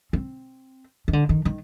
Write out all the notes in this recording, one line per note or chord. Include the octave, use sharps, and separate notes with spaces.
C4
D#3
D3
D#3
D#3